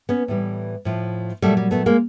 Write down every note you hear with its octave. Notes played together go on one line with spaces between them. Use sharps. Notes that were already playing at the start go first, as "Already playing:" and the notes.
B3 C#4
A2 E3 G3
A2 F3
A#2 F#3 G3 A3
G3
A3 B3
G#3 A#3